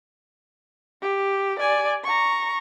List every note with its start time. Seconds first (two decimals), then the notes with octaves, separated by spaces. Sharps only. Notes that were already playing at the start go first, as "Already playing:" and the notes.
1.02 G4
1.59 D5 G#5
2.04 A#5 C#6